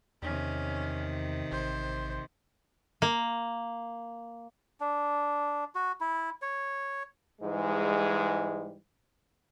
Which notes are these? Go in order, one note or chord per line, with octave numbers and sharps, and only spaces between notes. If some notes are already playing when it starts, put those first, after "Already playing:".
E2 C3 D#3 C#4
A1 C5
A#3
D4
F#4
E4
C#5
G#2 E3 G3 G#3